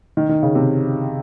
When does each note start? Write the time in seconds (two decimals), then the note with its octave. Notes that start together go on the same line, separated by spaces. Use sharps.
0.17 D#3
0.29 D#3
0.43 C#3
0.55 C3